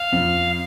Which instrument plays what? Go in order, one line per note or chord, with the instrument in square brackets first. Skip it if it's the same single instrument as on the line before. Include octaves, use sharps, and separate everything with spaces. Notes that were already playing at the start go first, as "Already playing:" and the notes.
Already playing: [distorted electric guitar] F5
[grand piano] F2